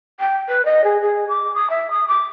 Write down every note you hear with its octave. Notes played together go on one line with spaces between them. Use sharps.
G5
B4
D#5
G#4
G#4
D6
D#6
E5
D#6
D6